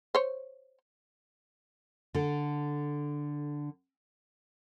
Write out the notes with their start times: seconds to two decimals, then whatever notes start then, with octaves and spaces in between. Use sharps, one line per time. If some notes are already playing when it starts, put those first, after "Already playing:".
0.15 C5 C#5
2.15 D3 A4